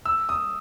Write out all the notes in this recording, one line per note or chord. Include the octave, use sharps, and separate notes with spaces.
E6
D#6